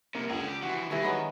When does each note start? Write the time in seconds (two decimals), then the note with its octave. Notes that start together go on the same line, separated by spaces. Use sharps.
0.15 C2 C3 A#3
0.30 C#2 D3 G#4
0.49 G4
0.62 E3 F3 F#4
0.91 G2 D#3 E3
1.03 F#3 G#3 B3